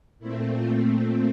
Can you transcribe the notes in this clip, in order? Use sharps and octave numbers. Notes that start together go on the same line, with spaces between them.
A#2 A3 C4 E4
F4